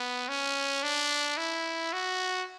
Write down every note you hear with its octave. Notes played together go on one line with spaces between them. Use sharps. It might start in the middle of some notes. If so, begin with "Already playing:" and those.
Already playing: B3
C#4
D4
E4
F#4